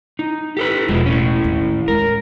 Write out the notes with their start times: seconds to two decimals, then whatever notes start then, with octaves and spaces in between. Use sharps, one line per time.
0.19 D#4
0.57 G4 A4 B4
0.88 E1 F3 G#3
1.06 A2 C#4
1.44 D#2
1.88 G#3 D#4 A#4